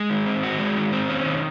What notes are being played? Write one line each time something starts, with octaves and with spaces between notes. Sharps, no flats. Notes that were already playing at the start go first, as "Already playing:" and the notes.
Already playing: G#3
D#3
C4
F#4
G#3
D#3
C4
C#4
D#3